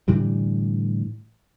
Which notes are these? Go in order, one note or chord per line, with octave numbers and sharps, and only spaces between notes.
A2 D3 E3 G3